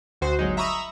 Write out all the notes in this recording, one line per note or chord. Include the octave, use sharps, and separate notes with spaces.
D2 F#4 C5
G1 F#3 G#3 D#4
E5 A#5 B5 C#6 D#6 E6